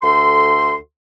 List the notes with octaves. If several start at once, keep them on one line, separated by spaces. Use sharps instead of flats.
D2 A4 C6